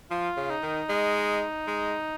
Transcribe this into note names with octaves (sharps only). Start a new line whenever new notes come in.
F3 F4
C#3
D#4
D#3
G#3
G#3